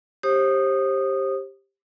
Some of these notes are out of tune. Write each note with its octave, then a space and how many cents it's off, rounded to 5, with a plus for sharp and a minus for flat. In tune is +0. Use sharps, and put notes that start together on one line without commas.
G4 +0 C5 +35 D#6 -15